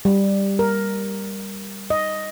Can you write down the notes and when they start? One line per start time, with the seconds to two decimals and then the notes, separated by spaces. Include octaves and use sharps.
0.05 G3
0.59 A#4
1.90 D#5